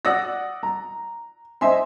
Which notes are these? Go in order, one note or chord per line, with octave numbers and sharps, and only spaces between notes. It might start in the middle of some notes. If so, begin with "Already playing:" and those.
D5 F#5 D#6 E6 A#6
A#5
C5 D#5 E5 G#5 C6